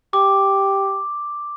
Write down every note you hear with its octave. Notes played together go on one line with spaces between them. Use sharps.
G4 D6